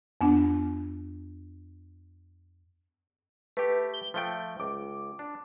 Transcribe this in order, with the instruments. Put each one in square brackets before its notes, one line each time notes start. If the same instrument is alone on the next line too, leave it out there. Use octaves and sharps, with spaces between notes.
[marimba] F2 B3 D4 F#5
[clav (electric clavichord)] A3 G4 [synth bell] B4
[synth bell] G7
[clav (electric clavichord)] F3 A3 G5
[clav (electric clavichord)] C#2 [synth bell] D6
[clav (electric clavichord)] D4